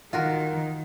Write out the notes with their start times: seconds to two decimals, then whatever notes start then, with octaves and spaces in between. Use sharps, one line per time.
0.13 D#3 F4 F#4 A#4